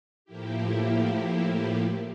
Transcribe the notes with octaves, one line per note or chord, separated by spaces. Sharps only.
A2 F3 A#3 E4 G4